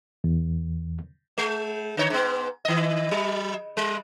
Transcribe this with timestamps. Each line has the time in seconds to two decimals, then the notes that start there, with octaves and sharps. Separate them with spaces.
0.24 E2
1.38 G#3
1.97 D3 C#5
2.10 G#2 B3
2.65 D#3 D#5
3.11 F#3
3.77 G3